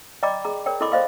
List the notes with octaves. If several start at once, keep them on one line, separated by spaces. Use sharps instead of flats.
D5 D#5 G5 A#5 B5 D6
G#4 A#5
A#4 C#5 D5 G5
E4 A4 D#5 B5 C6 D6
C5 D5 D#5 F5 B5 C6